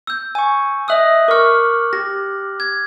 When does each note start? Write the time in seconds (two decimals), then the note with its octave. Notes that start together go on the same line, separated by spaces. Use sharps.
0.07 E6 G6
0.35 G#5 C#6
0.88 D#5 E5 D#6 E6 F#6 F#7
1.28 A#4 C#6 D6 F6
1.93 G4 A#6
2.60 G#6